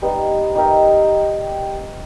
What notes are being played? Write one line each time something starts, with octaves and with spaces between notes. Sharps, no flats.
G3 B3 D#4
D#4 G4 A#4 E5